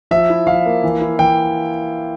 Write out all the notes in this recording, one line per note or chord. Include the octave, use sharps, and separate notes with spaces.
F3 E5
E4
F3 F5
A#3
E3
E4
E3 G5